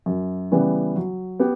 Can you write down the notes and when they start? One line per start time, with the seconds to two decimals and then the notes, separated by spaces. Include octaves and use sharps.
0.06 F#2
0.51 C#3 E3 G3 B3
0.96 F#3
1.40 B3 G4